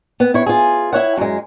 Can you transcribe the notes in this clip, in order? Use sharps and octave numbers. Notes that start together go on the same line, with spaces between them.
B3
E4 C#5
F4 G#4
E4 C#5 F#5
F#2 G#3